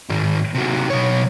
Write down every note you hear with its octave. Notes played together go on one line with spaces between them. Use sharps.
G#2 D#3
C3 F#3
B1 C#5